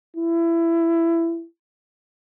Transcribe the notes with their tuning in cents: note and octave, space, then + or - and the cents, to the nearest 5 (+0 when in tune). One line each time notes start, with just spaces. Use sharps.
E4 +20